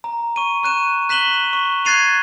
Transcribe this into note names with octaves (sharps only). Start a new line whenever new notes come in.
A#5
C#6 D#7
C#6 F#6 D#7 E7
F#6 B6 E7 F#7 G7
C#6
F#6 G#6 A6 C7 D#7 F7